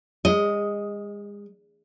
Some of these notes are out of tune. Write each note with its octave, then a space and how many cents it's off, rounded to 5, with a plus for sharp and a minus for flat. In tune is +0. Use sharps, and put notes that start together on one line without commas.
G#3 -30 D#5 +5